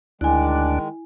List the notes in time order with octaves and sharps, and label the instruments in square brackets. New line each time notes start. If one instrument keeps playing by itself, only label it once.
[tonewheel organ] D2 D4 [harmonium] D#3 G#3 [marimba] E4 G#5